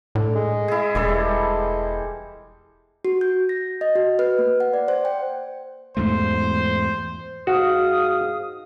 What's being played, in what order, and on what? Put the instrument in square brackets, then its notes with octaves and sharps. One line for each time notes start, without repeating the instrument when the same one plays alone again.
[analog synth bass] A2 [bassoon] D3
[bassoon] G#3
[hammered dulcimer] E4 G#4
[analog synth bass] E1 [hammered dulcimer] E3 G3 A4
[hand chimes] F#4
G6
A#6
D#5
F#4
B4
A#3
F#5
D5
C5
G5
[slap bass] E2 G#2 A3 [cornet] C5
[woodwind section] G#2 F5 D#6 [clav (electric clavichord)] F#4